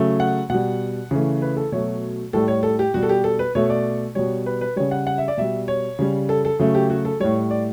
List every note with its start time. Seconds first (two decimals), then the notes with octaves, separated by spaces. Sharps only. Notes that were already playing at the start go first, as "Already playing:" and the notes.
Already playing: C#3 F#3 A3
0.20 F#5
0.50 B2 G3 F#5
1.11 C#3 E3 A3
1.42 B4
1.57 A4
1.72 B2 F#3 A3 C#5
2.33 A2 G3 A4
2.48 C#5
2.63 A4
2.79 G4
2.94 B2 G3 F#4
3.03 A4
3.09 G4
3.24 A4
3.39 B4
3.55 B2 A3 C#5
3.70 D5
4.15 B2 G3 C#5
4.46 B4
4.61 B4
4.76 C#3 G3 C#5
4.91 F#5
5.07 F#5
5.18 E5
5.28 D5
5.37 B2 G3 E5
5.68 C#5
5.99 C#3 G3
6.29 A4
6.45 A4
6.59 C#3 F#3 A3
6.75 G4
6.90 F#4
7.05 A4
7.20 A2 G3 C#5
7.51 D5